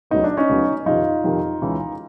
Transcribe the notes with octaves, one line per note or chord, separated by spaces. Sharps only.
D2 C#3 F#3 B3 D#4
D4
C#4 D#4
D2 C#3 F#3 B3
F2 C3 D#3 D#4 F4
F2 C3 D#3
C#2 C#3 E3